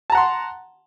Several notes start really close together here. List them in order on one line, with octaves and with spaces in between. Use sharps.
A5 A#5 F#5 C6